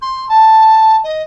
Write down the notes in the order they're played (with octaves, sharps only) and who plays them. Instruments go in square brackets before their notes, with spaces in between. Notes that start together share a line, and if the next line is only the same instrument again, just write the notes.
[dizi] C6
A5
D#5